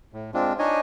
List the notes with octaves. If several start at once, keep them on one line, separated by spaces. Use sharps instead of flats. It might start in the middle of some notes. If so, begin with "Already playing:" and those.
A2
G#3 C4 D4 F4
D4 D#4 C#5 D#5 G#5